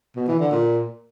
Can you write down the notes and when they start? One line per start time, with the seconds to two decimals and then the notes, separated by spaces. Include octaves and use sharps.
0.16 B2
0.28 E3
0.40 D3
0.51 A#2